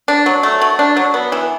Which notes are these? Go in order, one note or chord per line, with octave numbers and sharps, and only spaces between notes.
D4
F#3
A3
F#3
D4
F#3
B3
E3